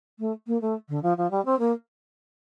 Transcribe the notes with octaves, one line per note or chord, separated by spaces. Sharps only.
A3
A#3
A3
D3
F3
F3
G3
C4
A#3